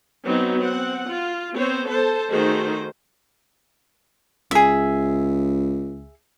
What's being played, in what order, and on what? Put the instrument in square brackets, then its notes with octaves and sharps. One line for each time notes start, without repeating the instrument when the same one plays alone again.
[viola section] F#3 B3 C4 D#4
C4 F#5
F4
B3 C4 C5 C#5
A4 C5 A5
D#3 A3 D#4 F#4 G#4 C5
[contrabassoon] C#2 [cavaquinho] G#4 E5